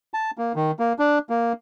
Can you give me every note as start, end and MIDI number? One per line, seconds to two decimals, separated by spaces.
0.14 0.31 81
0.38 0.52 58
0.56 0.71 51
0.79 0.93 58
0.99 1.19 62
1.30 1.53 58